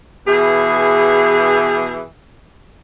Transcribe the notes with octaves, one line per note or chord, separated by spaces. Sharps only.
B2 E3 G#4